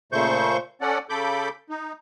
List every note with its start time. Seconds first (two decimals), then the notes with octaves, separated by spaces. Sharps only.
0.12 A#2 C#3 A3 C5 C#6 G6
0.81 C#4 A4 D5 F#5
1.10 C#3 A4 B5 D6 G6
1.70 D#4